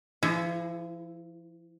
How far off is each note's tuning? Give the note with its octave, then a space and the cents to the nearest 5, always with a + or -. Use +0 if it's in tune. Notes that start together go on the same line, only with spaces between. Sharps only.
F3 -40 E4 +0 G#4 +0